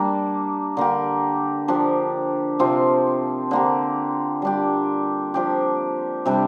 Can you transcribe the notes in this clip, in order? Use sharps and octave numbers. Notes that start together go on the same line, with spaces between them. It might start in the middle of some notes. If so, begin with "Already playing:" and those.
Already playing: G3 A#3 D4
D3 A#3 G4
F3 D4 G4
C3 F3 C4 F4
D3 A#3 G4
G3 D4 G4
F3 D4 G4
C3 G3 D4